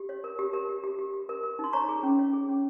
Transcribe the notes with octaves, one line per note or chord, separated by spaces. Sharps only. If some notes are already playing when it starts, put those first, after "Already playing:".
Already playing: G4
C#5
A#4
G4
A#4
G4
G4
G4
G4
A#4
A#4
D#4 C6
C#5 A#5 C#6
G#4
C#4
C#5
G#4
C#4